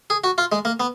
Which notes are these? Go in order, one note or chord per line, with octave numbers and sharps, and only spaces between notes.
G#4
F#4
F4
G#3
A#3
B3